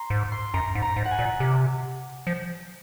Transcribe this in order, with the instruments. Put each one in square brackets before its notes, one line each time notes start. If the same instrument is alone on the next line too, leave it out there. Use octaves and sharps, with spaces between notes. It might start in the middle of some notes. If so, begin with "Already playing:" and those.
Already playing: [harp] A#5 C6
[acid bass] G#2
[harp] C6
[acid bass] F#2 [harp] A#5
[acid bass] G#2
[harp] A#5
[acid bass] G#2
[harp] F#5
G#5
[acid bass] A#2
C3
F3